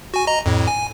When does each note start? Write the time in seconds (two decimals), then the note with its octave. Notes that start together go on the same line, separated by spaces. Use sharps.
0.14 F#4 G#5
0.27 D#5 A#5
0.46 F2 A2
0.67 G#5